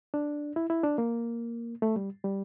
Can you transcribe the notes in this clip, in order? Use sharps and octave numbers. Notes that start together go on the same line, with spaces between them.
D4
E4
E4
D4
A#3
A3
G3
G3